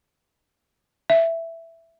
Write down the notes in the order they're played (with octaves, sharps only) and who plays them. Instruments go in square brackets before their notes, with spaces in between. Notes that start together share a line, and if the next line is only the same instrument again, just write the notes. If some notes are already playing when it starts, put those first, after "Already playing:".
[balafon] E5